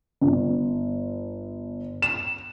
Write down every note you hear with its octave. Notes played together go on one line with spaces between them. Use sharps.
G1
E7